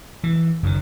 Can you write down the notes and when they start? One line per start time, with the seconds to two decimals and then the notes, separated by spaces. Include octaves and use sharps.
0.24 E3
0.63 F#1 F#2 C3 D#3